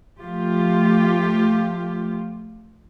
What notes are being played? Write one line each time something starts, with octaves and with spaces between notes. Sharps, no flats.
F3 A3 F4 G4